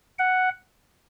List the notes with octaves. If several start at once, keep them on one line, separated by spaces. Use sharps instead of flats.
F#5